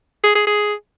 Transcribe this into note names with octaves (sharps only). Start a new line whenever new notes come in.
G#4
G#4
G#4